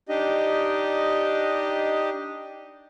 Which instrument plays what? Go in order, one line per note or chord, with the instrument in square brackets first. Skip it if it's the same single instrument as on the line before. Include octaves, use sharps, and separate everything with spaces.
[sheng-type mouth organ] D4 D#4 G4 D#5